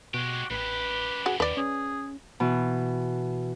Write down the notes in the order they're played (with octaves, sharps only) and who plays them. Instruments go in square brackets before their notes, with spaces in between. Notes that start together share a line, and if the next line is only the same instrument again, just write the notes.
[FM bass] B2 [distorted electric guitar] G#3 G4 [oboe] F#4
[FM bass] A1 [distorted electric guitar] F#2 G4 [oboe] B4
[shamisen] F#4 G#4
[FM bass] D#2 [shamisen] B4 D5
[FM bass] C#4 [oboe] G#4
[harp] B2 E3